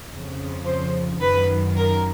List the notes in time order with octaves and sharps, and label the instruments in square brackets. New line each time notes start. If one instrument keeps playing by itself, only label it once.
[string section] F2 C#3 F3
C5
F#2 D#3 B4
A#4